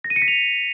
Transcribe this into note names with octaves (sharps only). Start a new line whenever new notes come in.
A#6
D#7
C#7
B6
F7